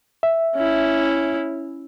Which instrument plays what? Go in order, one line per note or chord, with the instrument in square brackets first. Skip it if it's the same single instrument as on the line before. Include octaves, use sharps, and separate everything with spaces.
[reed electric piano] E5
[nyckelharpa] C#4 E4